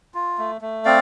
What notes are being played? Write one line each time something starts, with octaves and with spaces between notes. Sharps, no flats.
F4
A3
A3
C4 D5 F5